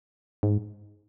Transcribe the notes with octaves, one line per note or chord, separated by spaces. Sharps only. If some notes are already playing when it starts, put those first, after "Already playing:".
G#2